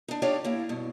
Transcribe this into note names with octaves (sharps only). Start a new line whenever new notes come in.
D4 D#4
D4 D#4 F4 G4 C#5 D5
A#3 E4
G2 B2